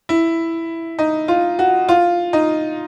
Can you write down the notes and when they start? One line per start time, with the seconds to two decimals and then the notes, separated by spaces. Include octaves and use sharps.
0.09 E4
0.99 D#4
1.28 F4
1.59 F#4
1.88 F4
2.33 D#4